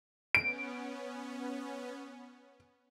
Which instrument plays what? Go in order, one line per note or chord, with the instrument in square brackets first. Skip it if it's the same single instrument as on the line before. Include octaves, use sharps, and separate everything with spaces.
[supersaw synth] B3 C#4 [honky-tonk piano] D7